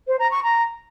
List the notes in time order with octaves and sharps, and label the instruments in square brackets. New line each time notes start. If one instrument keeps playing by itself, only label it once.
[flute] C5
A#5
C#6
A#5